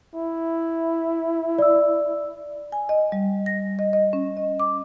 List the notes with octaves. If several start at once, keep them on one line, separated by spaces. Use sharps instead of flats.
E4
D5 E6
G#5
D#5
G3
A#6
D#5
D#5
C#4
D#5
D6